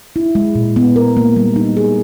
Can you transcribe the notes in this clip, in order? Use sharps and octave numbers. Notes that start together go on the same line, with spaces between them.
E4
G#3
A#2
B3
A#4
A#3
G3
D#4
G#4